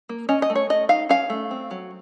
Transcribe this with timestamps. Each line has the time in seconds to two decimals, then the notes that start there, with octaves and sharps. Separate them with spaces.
0.09 A#3
0.29 C#4 D#5
0.42 D#5
0.50 A3
0.56 C#5
0.70 A3 D#5
0.89 D#4 F5
1.09 C#4 F5
1.30 A3
1.51 C4
1.71 F#3